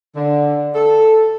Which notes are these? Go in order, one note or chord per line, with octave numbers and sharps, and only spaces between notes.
D3
A4